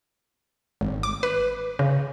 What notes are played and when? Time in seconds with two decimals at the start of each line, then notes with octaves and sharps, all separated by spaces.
0.81 G#1
1.03 D6
1.23 B4
1.79 C#3